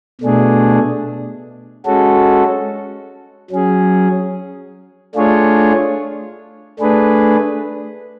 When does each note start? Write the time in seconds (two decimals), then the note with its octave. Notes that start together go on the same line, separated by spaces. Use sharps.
0.21 B2 A3 D4 G#4
1.86 G#3 C#4 F#4 A4
3.50 F#3 C#4 G#4
5.15 A3 D4 F4 G#4 C#5
6.79 A3 D4 G#4 B4